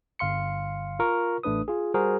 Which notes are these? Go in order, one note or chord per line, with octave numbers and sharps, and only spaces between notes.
G1 F5 C6 C#7
F4 A#4 C#6
A1 A3 D4 B4 D#6
F4 G#4
G3 F#4 G#4 A#4 C5